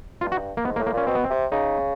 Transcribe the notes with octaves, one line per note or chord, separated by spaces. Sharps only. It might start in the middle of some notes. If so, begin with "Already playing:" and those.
G2 F4
F#4
A#3
G#2 B3
A#3
A2
A#3
A#2 C#4
B2 C4
B3
C4
C3
C#3 D#4